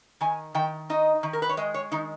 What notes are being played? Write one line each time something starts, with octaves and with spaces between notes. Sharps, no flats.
D#3 G#5
D#3 G5
D#4 D#5
D#3
A#4
B4
C#5
G#3 D#5
C#5
D#3 D#4